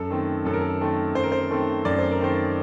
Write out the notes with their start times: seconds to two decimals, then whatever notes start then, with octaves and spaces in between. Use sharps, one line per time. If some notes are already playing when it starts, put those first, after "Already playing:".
Already playing: F#2 A4
0.10 D#3 A3 C4
0.45 F#2 A4
0.53 A#4
0.61 A4
0.81 D#3 A3 C4
1.15 F#2 C5
1.23 A#4
1.32 C5
1.50 D#3 A3 C4
1.85 F#2 D5
1.98 C5
2.11 A#4
2.20 D#3 A3 C4 C5